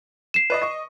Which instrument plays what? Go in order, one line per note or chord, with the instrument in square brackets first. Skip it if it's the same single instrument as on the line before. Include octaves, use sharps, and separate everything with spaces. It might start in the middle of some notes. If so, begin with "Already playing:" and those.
[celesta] C7 E7
[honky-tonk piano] B4 D5 D#5
D#5 C#6